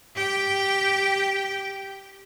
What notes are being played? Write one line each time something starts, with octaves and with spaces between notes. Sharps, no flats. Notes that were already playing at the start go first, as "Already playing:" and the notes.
G4 G5